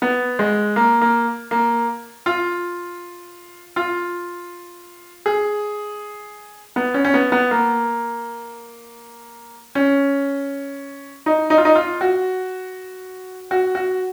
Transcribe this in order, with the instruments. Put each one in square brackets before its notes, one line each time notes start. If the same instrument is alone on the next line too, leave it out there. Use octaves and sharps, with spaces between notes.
[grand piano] B3
G#3
A#3
A#3
A#3
F4
F4
G#4
B3
C#4
C#4
B3
B3
A#3
C#4
D#4
D#4
F4
D#4
F4
F#4
F#4
F#4